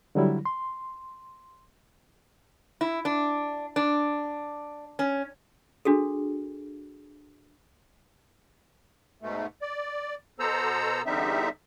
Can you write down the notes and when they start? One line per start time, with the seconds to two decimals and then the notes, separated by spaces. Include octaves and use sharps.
0.15 D3 F#3 G3 E4
0.45 C6
2.81 E4
3.05 D4
3.76 D4
4.99 C#4
5.85 D4 F#4 G#4 A4
9.22 G#2 B2 A3
9.62 D5
10.39 B2 B3 A4 C5 A#5 E6
11.06 E2 D3 G3 C4 D#4 E5